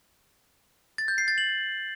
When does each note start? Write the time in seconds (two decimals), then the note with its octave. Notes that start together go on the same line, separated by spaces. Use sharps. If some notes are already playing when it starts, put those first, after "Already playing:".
0.98 A6
1.08 G6
1.18 C7
1.28 A6
1.38 F#7